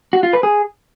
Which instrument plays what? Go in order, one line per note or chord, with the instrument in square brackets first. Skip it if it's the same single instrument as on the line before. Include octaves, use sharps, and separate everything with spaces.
[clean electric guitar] F#4
F4
B4
G#4